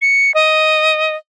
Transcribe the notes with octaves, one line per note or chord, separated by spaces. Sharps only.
C#7
D#5